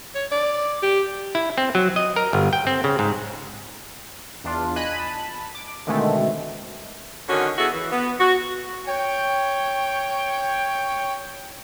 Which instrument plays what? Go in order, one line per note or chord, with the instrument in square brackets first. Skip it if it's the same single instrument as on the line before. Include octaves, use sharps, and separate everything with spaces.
[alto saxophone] C#5
D5
G4
[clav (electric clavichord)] E4
C4
F#3
D#5
A#4
G1
G5
C4
C#3
G#2
[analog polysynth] E2 D4 F4
D#5 G#5 B5 F#6 D#7
A5 B5
D6
B2 D3 D#3 G#3 A3 C4
[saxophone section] D3 D#3 C#4 F#4
B3 E4 F#4 G#4 A4
E3
B3
F#4
[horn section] C#5 G5